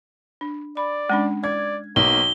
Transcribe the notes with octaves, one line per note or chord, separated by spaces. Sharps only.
D4
D5 B5
G#3 C#4 D4
D5 G#6
B1 A#3 G7